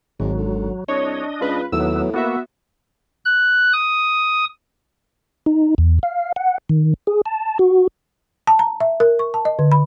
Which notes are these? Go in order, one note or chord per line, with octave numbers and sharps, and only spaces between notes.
G#1 G#2 F#3
D3
C2 D4 C#5 D#5
C#2 F4 B4
D#2 A2 F#3 B3 E6
A#3 B3 F#4 E5
F#6
D#6
D#4
E2
F5
F#5
D#3
G#4
A5
F#4
A5
A#5
E5
A#4
C#6
A5
D#5
D3
B5